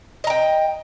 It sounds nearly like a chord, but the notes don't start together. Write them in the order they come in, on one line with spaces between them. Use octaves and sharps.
D#5 A#5 G5